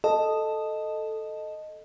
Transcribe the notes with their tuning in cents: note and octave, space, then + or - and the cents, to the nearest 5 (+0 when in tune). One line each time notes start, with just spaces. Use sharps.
A4 +0 D#5 -5